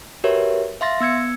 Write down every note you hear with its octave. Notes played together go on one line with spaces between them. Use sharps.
F#4 G4 A#4 B4 C#5 E5
E5 F5 C6 A6 A#6
B3 E6 G#6 C#7